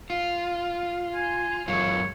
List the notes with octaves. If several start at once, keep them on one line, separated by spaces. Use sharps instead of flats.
F4
G#5
F#2 G#3 F4 C#5